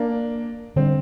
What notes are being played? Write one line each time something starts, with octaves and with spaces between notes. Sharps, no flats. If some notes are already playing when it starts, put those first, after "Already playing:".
Already playing: A#3 D4
D3 G3 C4 D4